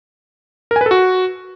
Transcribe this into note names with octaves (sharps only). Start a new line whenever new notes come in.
A#4
G#5
B4
A4
F#4